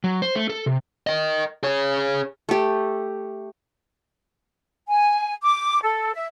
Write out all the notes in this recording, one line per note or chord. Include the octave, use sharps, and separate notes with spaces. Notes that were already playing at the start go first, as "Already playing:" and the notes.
F#3
C5
A3
A4
C3
A#4 D#5
G#4 C#5
A3 G4
G#5
D6
A4
E5